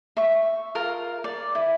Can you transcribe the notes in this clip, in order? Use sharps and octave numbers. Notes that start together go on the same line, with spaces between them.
E5 C#6
F4 A#4 F5
D5
E4